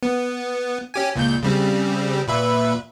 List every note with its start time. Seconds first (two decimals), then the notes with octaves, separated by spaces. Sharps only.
0.03 B3
0.94 C#4 G4 G#5
1.16 C#2 A#2 G6
1.43 C#3 G3 C4
2.28 A#2 B4 E5